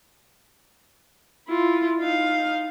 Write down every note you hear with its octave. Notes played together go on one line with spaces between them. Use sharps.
E4 F4
D#4 F5